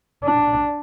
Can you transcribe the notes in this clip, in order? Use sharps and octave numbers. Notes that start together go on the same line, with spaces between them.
D4